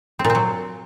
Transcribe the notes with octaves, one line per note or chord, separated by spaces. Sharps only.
C4
A#2
C4
F#3